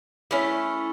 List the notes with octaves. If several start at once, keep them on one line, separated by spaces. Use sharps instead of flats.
A3 C#4 E4